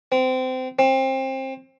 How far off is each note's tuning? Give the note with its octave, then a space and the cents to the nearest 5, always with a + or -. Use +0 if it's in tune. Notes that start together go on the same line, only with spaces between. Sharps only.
C4 -25
C4 +25